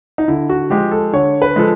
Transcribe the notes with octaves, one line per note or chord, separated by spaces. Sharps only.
D#4
D3 E4
F#4
F3 G#3 G4
A4
D3 C#5
B4
F3 G#3 A4